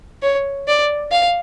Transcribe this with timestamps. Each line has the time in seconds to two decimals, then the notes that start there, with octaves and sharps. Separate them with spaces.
0.23 C#5
0.68 D5
1.12 F5